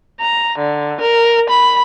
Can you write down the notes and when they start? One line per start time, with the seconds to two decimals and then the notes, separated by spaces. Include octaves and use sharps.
0.20 A#5
0.59 D3
1.01 A#4
1.50 B5